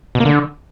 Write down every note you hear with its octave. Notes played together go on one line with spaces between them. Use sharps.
B2
A#3
D3